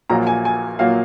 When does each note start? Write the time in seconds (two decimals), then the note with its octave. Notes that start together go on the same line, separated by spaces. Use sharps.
0.10 A#1 A#2 F#3 A#3 A#5
0.27 G#5
0.45 G#5
0.79 A#2 F#3 A#3 F5